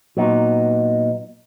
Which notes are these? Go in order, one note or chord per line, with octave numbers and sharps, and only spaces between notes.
A#2 F#3 B3 D#4